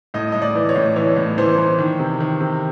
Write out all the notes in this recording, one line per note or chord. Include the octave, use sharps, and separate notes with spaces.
A2 D#5
A2 D#5
D5
E3
C#5
A2
E3 C#5
A2
E3 C5
E3
D#3
C3
D#3
C3